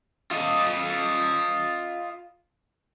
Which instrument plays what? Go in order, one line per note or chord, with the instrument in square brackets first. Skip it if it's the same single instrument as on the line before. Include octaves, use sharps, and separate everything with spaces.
[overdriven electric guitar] F4 D#5